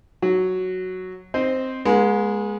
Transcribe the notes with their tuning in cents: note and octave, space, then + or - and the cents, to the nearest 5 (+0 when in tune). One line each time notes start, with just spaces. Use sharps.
F#3 +0 F#4 +0
C4 +0 C5 +0 D#5 +0
G#3 +0 B3 -45